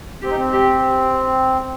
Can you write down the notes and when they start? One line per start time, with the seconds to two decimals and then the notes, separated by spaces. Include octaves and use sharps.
0.22 C4 G4
0.29 D#4
0.36 C4
0.53 G4